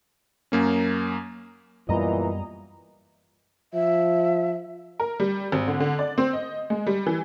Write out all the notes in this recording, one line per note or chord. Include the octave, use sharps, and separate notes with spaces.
F#2 A#3 C#4
F#2 A#2 E3 G3 B3 D#5 A#5
F3 E5
A#4
G3
G#1
D3
D3
D5
C4
D#5
G#3
G3
E3